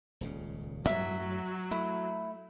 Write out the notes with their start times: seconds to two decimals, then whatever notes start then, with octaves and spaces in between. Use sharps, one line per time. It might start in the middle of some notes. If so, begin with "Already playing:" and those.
0.21 D#1 C#2 C#3
0.87 F#2 A2 F#3 A3 E5
1.71 A3 E4